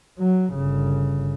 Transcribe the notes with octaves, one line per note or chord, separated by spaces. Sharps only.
F#3
G1 C#3